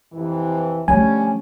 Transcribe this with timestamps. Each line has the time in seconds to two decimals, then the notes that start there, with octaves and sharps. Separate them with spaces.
0.13 F2 C3 E3
0.88 D3 F3 G3 A3 C#4 G#5